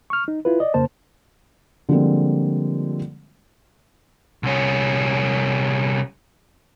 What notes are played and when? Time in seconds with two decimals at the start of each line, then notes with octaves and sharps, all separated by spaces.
0.10 C#6 F6
0.28 D#4
0.45 E4 F4 B4
0.60 D5 D#5
0.74 F2 C#3 A#3 C5 A5
1.89 D3 F3 G3 G#3 A#3 C4
4.43 C2 C#4